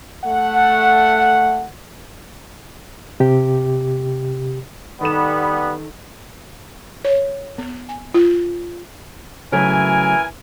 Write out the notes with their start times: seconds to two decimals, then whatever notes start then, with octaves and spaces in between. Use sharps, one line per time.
0.23 A3 F#5
3.20 C3 G4
5.01 D#3 G3 B3 A4 E7
7.05 C#5
7.58 B3
7.89 G#5
8.14 F4
9.52 C#3 E3 F#3 A3 A#4 G#5